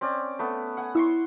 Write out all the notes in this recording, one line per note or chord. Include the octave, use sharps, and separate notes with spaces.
C4 C#4 D5
A3 B3
F#5 G#5
E4 C6 C#6 E6